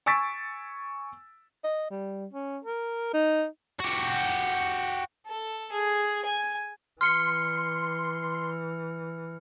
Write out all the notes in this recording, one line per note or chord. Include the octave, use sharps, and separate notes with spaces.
G#5 C#6 E6 A6 B6 D7
D#5
G3
C#4
A#4
D#4
F#4 G4
A4
G#4
G#5
E3 C6 F6 C#7